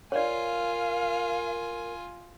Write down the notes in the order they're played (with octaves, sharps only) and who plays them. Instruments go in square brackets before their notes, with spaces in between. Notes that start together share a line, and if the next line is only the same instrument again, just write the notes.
[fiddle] F4 G#5 [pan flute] A#4 [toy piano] C#5 D5 [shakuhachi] F5